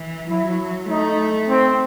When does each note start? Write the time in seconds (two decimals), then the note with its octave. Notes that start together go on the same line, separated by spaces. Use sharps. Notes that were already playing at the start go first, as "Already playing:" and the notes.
Already playing: E3
0.29 F#3 E4
0.89 A3 D#4
1.49 C4